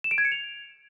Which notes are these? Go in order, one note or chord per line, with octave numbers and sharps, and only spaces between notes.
E7
D7
G#6
C#7
F7